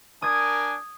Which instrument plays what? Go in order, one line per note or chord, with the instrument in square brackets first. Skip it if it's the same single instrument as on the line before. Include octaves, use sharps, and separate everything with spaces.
[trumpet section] D4 A#4 G#5 [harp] D#6 G#6